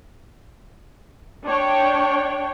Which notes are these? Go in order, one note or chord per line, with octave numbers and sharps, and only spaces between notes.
D4 C#5 G5